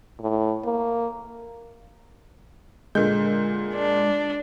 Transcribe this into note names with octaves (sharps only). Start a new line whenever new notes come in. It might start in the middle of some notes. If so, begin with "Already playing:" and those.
A2
A#3
A#2 D3 G#3 G6
D4